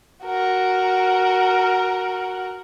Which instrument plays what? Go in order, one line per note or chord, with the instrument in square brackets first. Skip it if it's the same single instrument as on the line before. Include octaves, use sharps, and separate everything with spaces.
[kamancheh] F#4 A#4